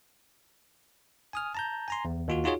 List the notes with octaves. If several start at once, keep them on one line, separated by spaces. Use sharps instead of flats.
G#5 D#6 F6
A5 A#5 G6
G#5 A#5 C6
E2
D#2 F4 F#4
D#4 F4 F#4 G#4 C#5